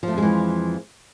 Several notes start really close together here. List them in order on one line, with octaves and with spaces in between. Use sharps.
F3 A3 F2 G#3 E3